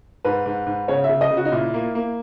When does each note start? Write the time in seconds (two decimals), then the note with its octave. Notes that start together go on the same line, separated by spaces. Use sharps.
0.25 G#2 B4
0.46 G#2
0.67 G#2
0.88 C#3 C#5
1.04 E5
1.09 C#3
1.21 D#5
1.31 C#3
1.37 F#4
1.45 D#4
1.52 A#2 E4
1.74 A#3
1.95 A#3